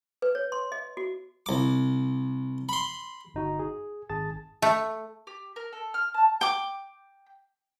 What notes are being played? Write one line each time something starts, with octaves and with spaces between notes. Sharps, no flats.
B4
C#5
C6
D#5
F#4
C2 D6
B5 C6
G1 D#4 F#4
G#4
G#1 G#4 A5 A6
A3
G4
A#4
A4
F6
A5
G5 D6